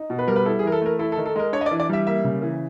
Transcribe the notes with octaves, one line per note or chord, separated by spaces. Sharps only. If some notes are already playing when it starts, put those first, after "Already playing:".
Already playing: D#4
B2
B4
G3 A#4
B4
E4 A4
G#4
E3 A#4
A4
A3 A#4
E4 A4
A4
D#3
A4
G#3 A#4
D4 C#5
D#5
D5
E3
D5
G3 E5
A#3 E5
C#3
E3